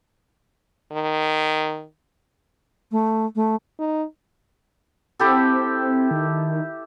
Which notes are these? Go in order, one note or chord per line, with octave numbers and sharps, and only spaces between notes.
D#3
A3
A3
D#4
C4 E4 G4 A4
D#3